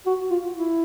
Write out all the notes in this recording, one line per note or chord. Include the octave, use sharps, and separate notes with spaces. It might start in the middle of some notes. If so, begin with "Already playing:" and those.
F#4
F4
E4